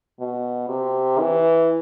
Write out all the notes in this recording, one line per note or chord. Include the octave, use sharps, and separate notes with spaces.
B2
C3
E3